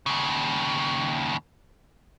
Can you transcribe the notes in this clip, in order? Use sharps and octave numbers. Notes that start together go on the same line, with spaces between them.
D#2 C#3